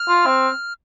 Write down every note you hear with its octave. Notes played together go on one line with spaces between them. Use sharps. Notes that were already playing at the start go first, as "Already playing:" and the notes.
Already playing: F6
F4
C4